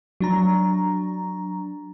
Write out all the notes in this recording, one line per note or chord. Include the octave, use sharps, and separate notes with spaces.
F#3 D4 A#5